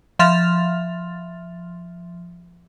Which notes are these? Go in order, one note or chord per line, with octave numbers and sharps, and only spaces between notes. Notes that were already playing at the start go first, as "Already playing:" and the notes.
F3 E5 C6 F6 A6 F7